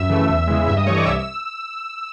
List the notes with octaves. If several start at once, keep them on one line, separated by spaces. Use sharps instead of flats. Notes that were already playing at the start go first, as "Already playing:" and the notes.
Already playing: F#2 E5 E6
C#3 E3 A3
E2
C#3 E3 G#3
G2 E5 E6
D#5 D#6
E3 A3 C#5 C#6
D5 D6
C2 E5 E6
E6